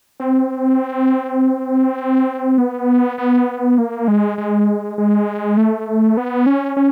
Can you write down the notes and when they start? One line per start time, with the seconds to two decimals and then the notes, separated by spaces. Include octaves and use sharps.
0.20 C4
2.58 B3
3.18 B3
3.78 A#3
4.08 G#3
4.38 G#3
4.98 G#3
5.57 A3
6.17 B3
6.46 C#4
6.77 C#4